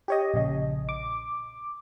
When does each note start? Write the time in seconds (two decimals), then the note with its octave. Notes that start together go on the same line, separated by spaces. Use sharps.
0.08 G4 C#5 D#5
0.34 A#1 C#3 D#5
0.89 D6